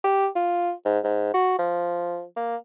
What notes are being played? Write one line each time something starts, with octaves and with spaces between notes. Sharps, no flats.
G4
F4
G#2
G#2
F#4
F3
A#3